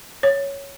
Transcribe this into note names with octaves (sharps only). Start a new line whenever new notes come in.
C#5